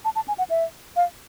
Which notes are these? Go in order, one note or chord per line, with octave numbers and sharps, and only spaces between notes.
A5
A5
G#5
F#5
E5
F5